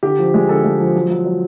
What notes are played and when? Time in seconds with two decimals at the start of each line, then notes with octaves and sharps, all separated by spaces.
0.03 D3 G4
0.18 F3
0.34 G#3
0.49 D3 A4
0.64 G#3
0.80 F3
0.95 F#3
1.11 F#3
1.25 F#3